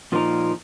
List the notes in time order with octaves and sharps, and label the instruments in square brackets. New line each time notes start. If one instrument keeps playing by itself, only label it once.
[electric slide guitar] A#2 F3 A#3 D#4 A#4